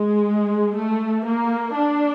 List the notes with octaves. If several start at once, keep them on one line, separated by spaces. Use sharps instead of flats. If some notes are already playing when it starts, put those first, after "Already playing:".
Already playing: G#3
A3
A#3
D4